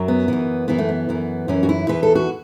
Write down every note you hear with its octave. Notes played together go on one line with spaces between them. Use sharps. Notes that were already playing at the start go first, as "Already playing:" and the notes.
Already playing: F#2 F#3
B3
F#2 E3
F#2 E3 B3
A3
B3
F#2 E3
F#2 E3 C#4
F#4
E4
E2 E3 B4
A4
F#4